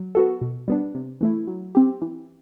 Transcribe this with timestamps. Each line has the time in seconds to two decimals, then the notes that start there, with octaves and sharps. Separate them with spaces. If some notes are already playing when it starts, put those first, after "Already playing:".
Already playing: F#3
0.15 B3 F#4 A4
0.41 B2
0.68 G3 B3 D4
0.95 C3
1.21 E3 A3 E4
1.47 F#3
1.75 C4 G4
2.02 E3